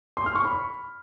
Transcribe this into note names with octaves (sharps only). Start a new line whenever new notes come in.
C6
F6
C#6
B5